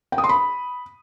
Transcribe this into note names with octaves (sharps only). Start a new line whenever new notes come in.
G5
D#6
C6
B5